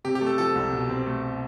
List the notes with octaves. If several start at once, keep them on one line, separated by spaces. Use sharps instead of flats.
C3 G4
G4
A3
A4
F3 A4
C2
B2
C4
A3